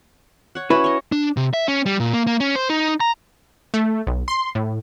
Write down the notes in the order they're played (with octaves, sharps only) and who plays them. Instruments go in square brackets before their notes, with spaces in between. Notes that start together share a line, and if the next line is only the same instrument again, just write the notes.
[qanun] C#5 F#5
[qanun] C#4 F#4 [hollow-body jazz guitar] E4 B4
[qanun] C#5 D#5
[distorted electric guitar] D4
C3
E5
C#4
G3
A#2
A#3
A#3
C#4
C5
D#4
A#5
[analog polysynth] A3
B1
C6
A2